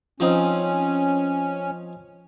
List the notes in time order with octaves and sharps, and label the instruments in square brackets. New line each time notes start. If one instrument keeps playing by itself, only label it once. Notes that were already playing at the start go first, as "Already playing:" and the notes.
[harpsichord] F3 C4 D#4 [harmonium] C#4